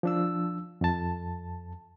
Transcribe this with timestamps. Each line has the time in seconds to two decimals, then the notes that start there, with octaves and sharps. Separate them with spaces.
0.03 F3 D4 E6
0.81 F2 A5